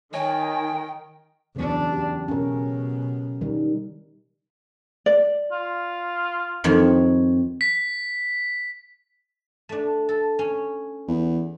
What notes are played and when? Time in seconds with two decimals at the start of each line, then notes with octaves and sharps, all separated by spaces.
0.14 D#3 C#5 D#5 G5 G#5
1.56 E2 C#3 F#3 D4
1.91 G4
2.28 B2 C#4 A#4
3.41 D#3 G3
5.06 D5
5.52 F4
6.64 F2 D#3 C#5
7.61 B6
9.69 A3 D4
10.09 A4
10.39 C#4
11.08 E2